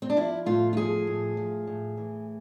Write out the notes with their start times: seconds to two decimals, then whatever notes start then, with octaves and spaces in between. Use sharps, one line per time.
0.02 C4
0.10 D4
0.16 F3 E4
0.46 A2 F4
0.73 F4
0.77 F3 G#4
1.07 A2
1.37 F3
1.67 A2
1.97 E3